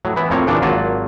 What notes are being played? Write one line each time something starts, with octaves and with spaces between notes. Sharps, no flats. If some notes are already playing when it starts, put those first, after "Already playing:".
A2 F#3
E3 B3 E4
F2 A2 A#3 C4 C#5
A#2 C#3 E3 D4
G#1 F#3 A#3 F4 F#4 A5